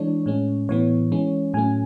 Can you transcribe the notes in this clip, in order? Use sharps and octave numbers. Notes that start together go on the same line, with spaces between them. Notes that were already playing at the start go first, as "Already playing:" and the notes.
Already playing: E3 G#3 D4 C#5
A2 G#3 C#4
A2 E3 B3 C#5
E3 G#3 C#4
A2 F#3 A3 C#4 G#5